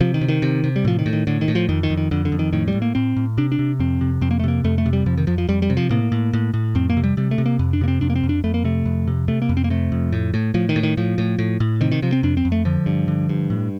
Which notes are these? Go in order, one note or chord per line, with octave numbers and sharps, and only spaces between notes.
C3 F3
D#3
C3
D#3
C3
C3
G3
A2 F3
D#3
A2
D#3
A2 D3
D#3
A2
F3
F2 D#3
D#3
F2
D#3
F2 D3
D3
F2
D#3
A2 D#3
G3
A2
A#3
A2 C4
A2
C3 D4
D4
C3
F2 C4
C3
F2 C4
A#3
A3
C3 A#3
F2 A3
A3
C3
G3
F2 F3
D#3
F2 F3
F3
F2 G3
G3
C3
F3
A2 A#3
A2
A2
A2
F2 C4
A#3
C3
G3
C3 G3
A3
C3
A#3
F2
D4
C3 A#3
C4
F2 D4
A#3
C4
F2
D4
F2 A3
A#3
C3 A3
F2
C3
C3 A3
A#3
F2
C4
A#3
C3 A3
F2
A2
A2
A2 F3
D#3
A2
D#3
A2 F3
A2
A2
A2
C3 D#3
D#3
C3 F3
C4
F2 D4
C4
F2
A3
D3 F3
G2
D3
G2
A2